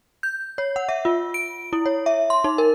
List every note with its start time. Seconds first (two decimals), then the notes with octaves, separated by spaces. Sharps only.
0.23 G6
0.58 C#5
0.76 F#5
0.89 E5
1.05 F4
1.34 D7
1.73 E4
1.86 C#5
2.06 E5
2.30 C6
2.44 D#4
2.58 A#4